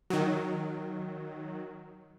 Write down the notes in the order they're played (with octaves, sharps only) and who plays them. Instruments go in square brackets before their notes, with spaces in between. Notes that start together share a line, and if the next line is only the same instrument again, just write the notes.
[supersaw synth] D#3 F#3